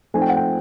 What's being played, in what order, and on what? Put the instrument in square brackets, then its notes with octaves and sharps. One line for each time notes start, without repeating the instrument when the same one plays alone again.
[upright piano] F3 A3 C4 D#4 G#5
G5
F#5
G5